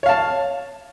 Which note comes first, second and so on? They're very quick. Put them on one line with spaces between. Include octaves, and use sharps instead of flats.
C#5 F5 A5